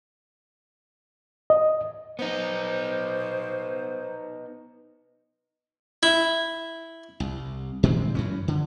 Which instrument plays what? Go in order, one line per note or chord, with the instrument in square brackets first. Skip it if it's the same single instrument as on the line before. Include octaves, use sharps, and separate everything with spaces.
[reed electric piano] D#5
[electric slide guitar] B3 D#4 [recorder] C5
[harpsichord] E4
[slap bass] C2
A#2 D#3 G#3 C4
F#2 E3 C#4
D3